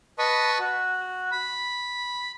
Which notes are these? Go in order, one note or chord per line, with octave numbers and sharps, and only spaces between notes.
B4 D#5 A5 B5 C#6 D#6
F#4
B5